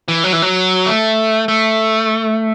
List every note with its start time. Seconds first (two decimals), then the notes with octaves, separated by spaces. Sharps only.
0.08 E3
0.24 F#3
0.33 E3
0.42 F#3
0.86 A3
1.48 A3